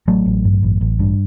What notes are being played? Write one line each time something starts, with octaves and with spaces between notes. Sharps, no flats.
A1 F#3 A3
A1
G2
A1
A1
G2